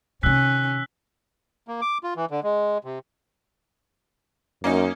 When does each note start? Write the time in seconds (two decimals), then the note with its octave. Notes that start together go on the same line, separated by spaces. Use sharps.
0.23 C3 D#3 C#4 E6 F#6 B6
1.68 A#3
1.81 D6
2.04 F4
2.16 E3
2.31 D3
2.43 G#3
2.85 C3
4.64 F#2 A#3 C#4 D#4